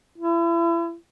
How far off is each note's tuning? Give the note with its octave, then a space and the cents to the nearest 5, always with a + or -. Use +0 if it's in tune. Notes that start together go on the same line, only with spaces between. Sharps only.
E4 +35